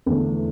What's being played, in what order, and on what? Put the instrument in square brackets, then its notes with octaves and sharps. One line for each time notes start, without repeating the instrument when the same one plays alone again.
[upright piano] E2 D3 A3